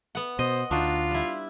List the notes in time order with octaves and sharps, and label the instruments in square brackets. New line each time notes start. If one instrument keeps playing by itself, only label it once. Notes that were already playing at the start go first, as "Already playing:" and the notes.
[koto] B3 F#5
[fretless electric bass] B2 [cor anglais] C5 [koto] D#5
[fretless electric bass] D2 [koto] D4 D#4 F#4 [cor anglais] F4
[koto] G3 E4